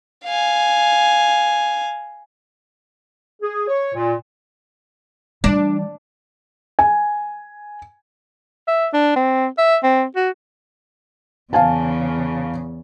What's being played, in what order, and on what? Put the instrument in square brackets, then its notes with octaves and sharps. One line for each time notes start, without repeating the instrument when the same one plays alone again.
[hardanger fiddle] F5 G#5
[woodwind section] G#4
C#5
A#2
[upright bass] E3 G3 [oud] D4
[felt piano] G#5
[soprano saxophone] E5
D4
C4
E5
C4
F#4
[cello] E2 C#3 [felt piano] F5 G#5 A5